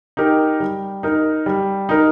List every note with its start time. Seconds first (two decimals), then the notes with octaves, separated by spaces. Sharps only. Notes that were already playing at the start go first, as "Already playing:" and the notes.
0.17 D#4 G4 A#4
0.60 G3
1.03 D#4 A#4
1.46 G3
1.89 D#4 A#4